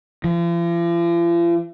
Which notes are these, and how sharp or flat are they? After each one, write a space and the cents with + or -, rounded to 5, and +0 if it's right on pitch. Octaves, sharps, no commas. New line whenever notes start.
F3 -45